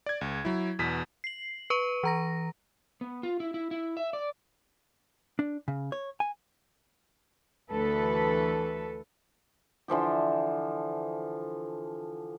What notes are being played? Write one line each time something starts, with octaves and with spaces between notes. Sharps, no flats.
D5 G#6
C#2
F#3 E4
E2 B2 B6
C7 F#7
B4 C#6 D#7
E3 A#5 A#6
B3
F4
E4
E4
E4
E5
D5
D4
C#3
C#5
G#5
D2 E3 A4 B4
D3 E3 F3 G4